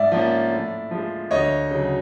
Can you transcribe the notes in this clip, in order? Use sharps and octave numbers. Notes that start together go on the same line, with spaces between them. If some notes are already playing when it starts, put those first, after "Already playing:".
Already playing: G#2 D5 E5
F3 A#3 C#4
A2
F3 G#3
D2 C#5 D#5
C#3 F#3